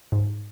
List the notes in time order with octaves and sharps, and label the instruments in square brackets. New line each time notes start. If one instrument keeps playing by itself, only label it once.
[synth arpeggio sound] G#2